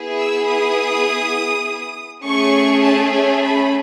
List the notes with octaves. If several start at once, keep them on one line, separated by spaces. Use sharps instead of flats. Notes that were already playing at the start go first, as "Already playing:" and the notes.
Already playing: B3 E4 G#4
E6
D#6
A3 C#4 G#4 C#6
A5
G#5
B5